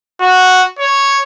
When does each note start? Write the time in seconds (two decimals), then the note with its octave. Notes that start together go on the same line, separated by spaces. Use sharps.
0.21 F#4
0.79 C#5